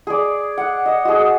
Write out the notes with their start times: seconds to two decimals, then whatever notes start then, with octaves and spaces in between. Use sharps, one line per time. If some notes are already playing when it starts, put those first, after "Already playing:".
0.07 G#4 D5
0.58 F#5
0.86 D#5
1.05 F#4 G#4